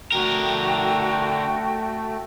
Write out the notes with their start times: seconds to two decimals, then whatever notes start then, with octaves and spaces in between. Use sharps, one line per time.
0.12 D3 A3 F#4 A#4 G5